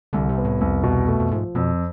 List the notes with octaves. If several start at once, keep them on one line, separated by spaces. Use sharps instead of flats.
C2 D3
C3
B3
A2
C2 F2
E2 B2
F2 A3
F2
G#2 F3
F2 B2